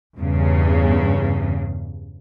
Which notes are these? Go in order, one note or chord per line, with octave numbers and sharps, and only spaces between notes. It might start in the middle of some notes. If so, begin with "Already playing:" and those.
E2 G2 C#3